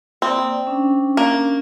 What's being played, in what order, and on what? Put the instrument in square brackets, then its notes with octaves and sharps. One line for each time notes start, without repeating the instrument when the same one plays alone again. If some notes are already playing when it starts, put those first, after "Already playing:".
[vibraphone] A#3 D5 D#6 [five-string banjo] C4
[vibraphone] C#4 D4
[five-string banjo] A#3